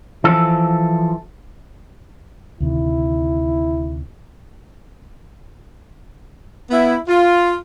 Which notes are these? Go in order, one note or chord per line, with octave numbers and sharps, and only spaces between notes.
E3 F3 A4
D2 C3 D#3 E4
B3 E4
F4